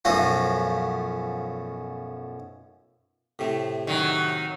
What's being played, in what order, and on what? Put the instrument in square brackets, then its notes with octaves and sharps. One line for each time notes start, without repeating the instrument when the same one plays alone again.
[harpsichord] B1 F#2 F3 A3 C#4 F#4
A2 C3 A3
[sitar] D#3 F#3